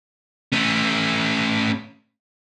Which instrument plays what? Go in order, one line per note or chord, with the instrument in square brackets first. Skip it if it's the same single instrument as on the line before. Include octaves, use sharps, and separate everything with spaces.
[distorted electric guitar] A3 C#4